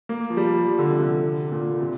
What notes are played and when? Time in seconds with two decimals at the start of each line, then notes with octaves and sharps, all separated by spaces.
0.09 A#3
0.30 F3
0.37 G3
0.65 F3
0.79 D3
0.91 C3
1.03 D3
1.52 A#2
1.74 D3
1.80 C3